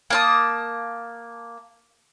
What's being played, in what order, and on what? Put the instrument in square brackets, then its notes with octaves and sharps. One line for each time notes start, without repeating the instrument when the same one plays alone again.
[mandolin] A#3 A5 D#6